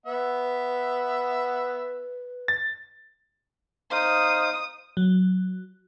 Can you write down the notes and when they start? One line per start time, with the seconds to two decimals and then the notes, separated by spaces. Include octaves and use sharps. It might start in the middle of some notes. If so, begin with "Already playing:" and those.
0.06 B3 B4 E5 F#5
2.48 A6
3.92 D#4 C5 F5 D#6
4.97 F#3